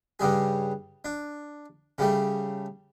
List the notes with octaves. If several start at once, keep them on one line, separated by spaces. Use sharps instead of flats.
G2 C#3 G3 G#4
D4
C#3 G3 A3